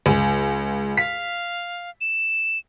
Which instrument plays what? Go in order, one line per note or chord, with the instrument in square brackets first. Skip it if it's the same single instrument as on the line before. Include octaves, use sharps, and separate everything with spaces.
[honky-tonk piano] C#2
[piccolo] F5 [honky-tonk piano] B6
[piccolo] E7